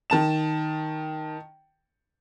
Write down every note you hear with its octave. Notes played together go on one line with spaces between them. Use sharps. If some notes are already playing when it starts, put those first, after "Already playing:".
D#3 A5 E7